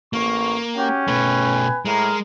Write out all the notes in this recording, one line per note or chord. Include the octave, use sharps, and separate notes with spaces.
A1 A#3 C#6
C#4 F#4 G4
B2 A3 B4 G5 G#5
A2 G#3 A#4